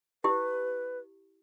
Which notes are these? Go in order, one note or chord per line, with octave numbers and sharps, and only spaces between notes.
E4 G4 B4